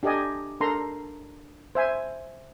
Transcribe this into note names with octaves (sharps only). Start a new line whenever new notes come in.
D4 G4 A4 D5 D#5 G#5
D4 A4 A#4 A#5 C6
C5 E5 G#5